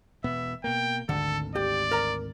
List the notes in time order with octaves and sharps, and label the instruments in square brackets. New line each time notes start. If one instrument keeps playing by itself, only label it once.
[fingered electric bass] E1 B2 B3 [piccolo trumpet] E5
[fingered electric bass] B2 A#3 [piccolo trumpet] G5
[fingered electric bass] G#1 D2 [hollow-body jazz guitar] D3 [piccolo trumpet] A4
[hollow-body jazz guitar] G4 [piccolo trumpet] D5
[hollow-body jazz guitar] A#4 A#5